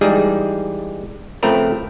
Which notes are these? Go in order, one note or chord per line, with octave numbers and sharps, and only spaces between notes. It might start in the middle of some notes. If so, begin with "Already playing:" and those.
E3 G3 G#3 D#4 G#4
C#3 F3 A3 C4 A#4 B4